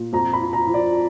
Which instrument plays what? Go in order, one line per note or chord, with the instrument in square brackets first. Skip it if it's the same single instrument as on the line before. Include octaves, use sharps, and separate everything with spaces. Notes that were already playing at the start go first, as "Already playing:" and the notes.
Already playing: [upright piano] A#2
F2 A#5
B5
F3
A#5
F3
D5